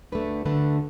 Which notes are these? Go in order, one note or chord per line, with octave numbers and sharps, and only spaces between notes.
D2 D3 A3 B4
D2 D3 A3 B4